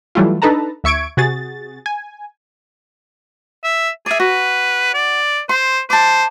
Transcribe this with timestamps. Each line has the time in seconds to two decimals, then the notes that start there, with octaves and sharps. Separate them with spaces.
0.15 E3 F#3 G3 A3 E4 F4
0.42 D4 D#4 A4 B4 A5 A#5
0.84 D2 E5 C#6 G#6 D7
1.17 C3 F#4 G#4 A6
1.86 G#5
3.64 E5
4.06 G#4 D5 E5
4.20 F#4 B4
4.94 D5
5.49 C5 C6
5.90 C5 A5 D6